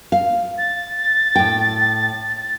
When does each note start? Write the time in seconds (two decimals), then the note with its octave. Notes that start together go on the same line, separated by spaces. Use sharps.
0.12 F5
0.58 A6
1.36 A2 G5